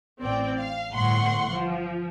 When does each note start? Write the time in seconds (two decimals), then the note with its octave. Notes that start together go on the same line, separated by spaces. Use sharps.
0.21 A1 C4 D5 G5
0.57 F5
0.92 G1 A2 F#5 C6 C#6
1.51 F3